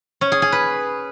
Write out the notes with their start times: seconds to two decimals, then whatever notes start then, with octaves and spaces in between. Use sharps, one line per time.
0.21 C#4
0.32 G#4
0.42 G#4
0.52 B4